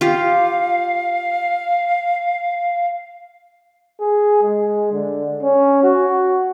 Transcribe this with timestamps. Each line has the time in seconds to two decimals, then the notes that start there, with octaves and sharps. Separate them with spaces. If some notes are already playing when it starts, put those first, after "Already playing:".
0.01 F4 G4 F5
4.01 G#4
4.43 G#3
4.93 D3
5.43 C#4
5.83 F#4